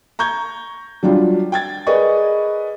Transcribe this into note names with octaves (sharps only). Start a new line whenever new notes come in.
A#5 C#6 G6 G#6
F#3 G3 D4 F4
G5 G#6 A6
G#4 A#4 B4 D5 D#5 C#6